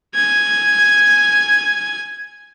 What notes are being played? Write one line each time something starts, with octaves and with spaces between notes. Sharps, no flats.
G#5 G#6